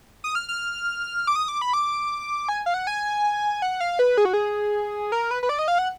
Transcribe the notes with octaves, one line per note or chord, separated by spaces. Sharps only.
D#6
F6
F6
D6
D#6
D6
B5
D6
G#5
F5
F#5
G#5
F#5
F5
B4
G#4
F#4
G#4
A#4
B4
B4
D5
D#5
F5
F#5